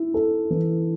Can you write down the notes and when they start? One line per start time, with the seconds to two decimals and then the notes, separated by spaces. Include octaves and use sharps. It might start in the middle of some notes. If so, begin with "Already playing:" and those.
Already playing: E4
0.14 A4
0.50 E3